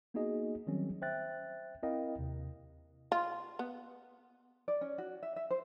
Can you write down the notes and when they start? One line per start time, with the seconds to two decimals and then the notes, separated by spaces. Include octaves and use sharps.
0.14 A#3 B3 D#4 F#4 G#4 D#5
0.67 D#3 F#3 G3 C4 C#4
1.02 C5 E5 G5 F#6 A6
1.83 C4 E4 A#4 D#5 F5 G5
2.19 D#2 C3
3.12 F4
3.59 B3
4.68 D5
4.81 C#4
4.98 F#4
5.23 E5
5.36 E5
5.50 C5